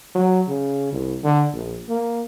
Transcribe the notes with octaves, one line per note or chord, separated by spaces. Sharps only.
F#3
C#3
C2
D3
A#1
A#3